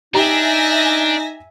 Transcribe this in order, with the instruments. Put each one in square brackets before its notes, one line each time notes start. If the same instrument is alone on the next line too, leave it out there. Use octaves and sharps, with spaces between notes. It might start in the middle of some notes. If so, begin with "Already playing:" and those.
[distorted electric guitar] D4 [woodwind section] D#4 [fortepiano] G4 A#5 [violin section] E5 G#5 A#6